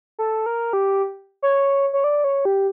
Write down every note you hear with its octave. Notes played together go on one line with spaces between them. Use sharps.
A4
A#4
G4
C#5
C#5
D5
C#5
G4